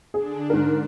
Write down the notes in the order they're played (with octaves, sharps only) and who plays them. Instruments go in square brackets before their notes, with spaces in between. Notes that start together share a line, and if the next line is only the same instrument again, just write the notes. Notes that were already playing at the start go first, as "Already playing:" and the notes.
[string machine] D3 D4 [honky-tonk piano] G#4
[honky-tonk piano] G#2 A#4